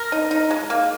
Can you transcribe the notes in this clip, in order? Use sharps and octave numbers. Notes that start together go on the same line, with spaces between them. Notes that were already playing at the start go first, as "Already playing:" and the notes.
Already playing: A#4
D#4
D#4
G#3
A#3